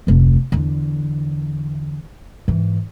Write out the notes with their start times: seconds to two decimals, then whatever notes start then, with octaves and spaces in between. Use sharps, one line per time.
0.07 F1 D2
0.52 E2 D3
2.48 G#2 E3